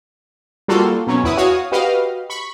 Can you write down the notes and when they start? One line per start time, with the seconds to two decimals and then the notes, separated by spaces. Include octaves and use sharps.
0.68 G3 A#3 F4 F#4 A4 C6
1.07 B2 F#3 C#4
1.24 E2 E4 B4 D#6
1.37 F#4 C#5 F5 D#6
1.72 F#4 G4 B4 D#5 F5
2.30 B5 C#6